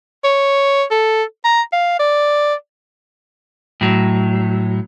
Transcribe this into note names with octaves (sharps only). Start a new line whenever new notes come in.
C#5
A4
A#5
F5
D5
A2 F#3